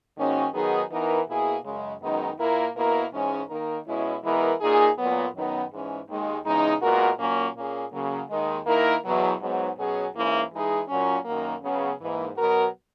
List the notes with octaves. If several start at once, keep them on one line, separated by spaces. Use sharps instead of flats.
G#2 D#3 A#3 C#4 F#4
D#3 F#3 B3 D#4 G#4
E3 B3 D#4 A#4
B2 A#3 E4 G#4
F#2 C#3 G#3
F#2 D#3 G#3 B3 D#4
A#2 A#3 E4 A#4
B2 A#3 E4 A#4
G#2 E3 G#3 C#4
D#3 A#3 D#4 A#4
B2 G#3 C#4 E4
E3 G#3 B3 E4 A#4
A#2 A#3 D#4 G#4
A#2 F#3 B3
F#2 D#3 F#3 B3 D#4
G#2 E3 G#3 C#4
D#2 D#3 G#3
E2 C#3 G#3 D#4
A#2 G#3 B3 F#4 A#4
A#2 F#3 A#3 C#4
A#2 A#3 C#4 G#4
C#3 F#3 A#3
D#2 D#3 G#3
D#3 A#3 E4 A#4
E2 B2 F#3
G#2 F#3 B3
B2 F#3 C#4 G#4
G#2 E3 A#3 C#4 E4
E3 G#3 D#4 G#4
A#2 F#3 C#4
F#2 D#3 F#3 A#3
C#3 F#3 B3
G#2 E3 A#3
B2 F#3 B3 F#4 A#4